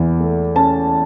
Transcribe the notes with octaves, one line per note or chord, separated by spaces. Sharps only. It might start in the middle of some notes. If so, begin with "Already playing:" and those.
Already playing: E2 E3
A3
C#4 A5